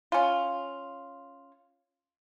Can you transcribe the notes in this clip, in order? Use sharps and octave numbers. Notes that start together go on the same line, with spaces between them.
C#4 F4